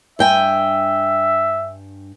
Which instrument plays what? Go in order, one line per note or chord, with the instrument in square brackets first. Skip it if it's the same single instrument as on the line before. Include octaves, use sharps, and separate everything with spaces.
[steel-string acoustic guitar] G2 G5 G#5 [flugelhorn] E5